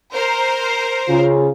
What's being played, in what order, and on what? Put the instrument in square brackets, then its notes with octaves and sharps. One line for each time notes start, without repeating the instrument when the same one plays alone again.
[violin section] A#4 C5
[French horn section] C#3 F4